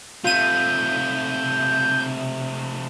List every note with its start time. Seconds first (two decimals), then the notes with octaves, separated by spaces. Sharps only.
0.24 C3 A3 F4 G6 D#7